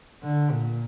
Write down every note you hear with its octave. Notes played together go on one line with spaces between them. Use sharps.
D3
A#2